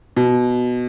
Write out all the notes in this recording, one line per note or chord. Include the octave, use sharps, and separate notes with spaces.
B2